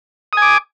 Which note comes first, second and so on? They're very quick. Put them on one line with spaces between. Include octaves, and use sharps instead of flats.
D#6 G#5 D6